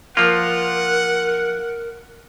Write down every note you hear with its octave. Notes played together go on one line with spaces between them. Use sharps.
F3 A#3 F4 A#4 F#5